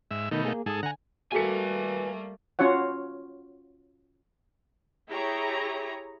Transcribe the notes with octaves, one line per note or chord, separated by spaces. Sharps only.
G#2 E5
B2 D#3 A3 D#4 B5 G6
A#3 G#4
G#2 G#4 A4 D#6
D3 F#5 G#5 A#5
G3 A3 A#3 F#4 A4 B4 G#5 C#7
C#4 F4 F#4 C#5 F#5
E4 G4 G#4 C#5 A#5